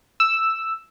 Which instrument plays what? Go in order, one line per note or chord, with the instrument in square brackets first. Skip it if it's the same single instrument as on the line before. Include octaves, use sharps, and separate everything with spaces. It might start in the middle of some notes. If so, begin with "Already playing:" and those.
[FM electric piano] E6